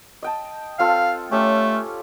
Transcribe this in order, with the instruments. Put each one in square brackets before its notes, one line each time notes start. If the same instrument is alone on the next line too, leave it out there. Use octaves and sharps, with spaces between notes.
[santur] D#5 G5 A5
[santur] C4 F4 A4 [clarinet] F5
[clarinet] A3 [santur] C#4 G4 A4